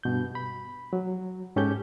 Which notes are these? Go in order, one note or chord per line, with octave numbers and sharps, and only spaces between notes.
G2 B2 G6
B5
F#3
G#2 C#4 G4 A4 G6